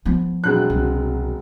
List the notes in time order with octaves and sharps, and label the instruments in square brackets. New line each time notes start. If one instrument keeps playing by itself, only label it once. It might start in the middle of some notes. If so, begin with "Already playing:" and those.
[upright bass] F3 B3
[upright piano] E1 F#3 F#6
[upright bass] C2